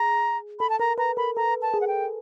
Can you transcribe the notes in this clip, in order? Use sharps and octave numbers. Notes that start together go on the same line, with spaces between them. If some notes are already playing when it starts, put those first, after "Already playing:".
Already playing: G#4 A#5
A4 B5
A5
A#4 A#5
B4 A#5
A#4 B5
A4 A#5
A5
G#4
F#5
G5